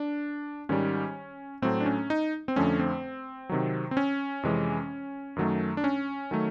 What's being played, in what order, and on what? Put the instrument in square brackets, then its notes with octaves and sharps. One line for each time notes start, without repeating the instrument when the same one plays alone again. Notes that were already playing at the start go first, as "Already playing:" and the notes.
Already playing: [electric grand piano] D4
G#2 D#3 G3 C#4
A2 F#3 A3 C4
D4
C#4
D#4
C4
F2 D3 F3 A3 C#4
C4
C3 D#3 F#3
C4
C#4
F2 C3 E3 G#3
F#2 D#3 F#3 A3
D4
C#4
D#3 F#3 A3